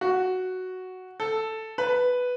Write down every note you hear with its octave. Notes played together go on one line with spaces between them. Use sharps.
F#4
A4
B4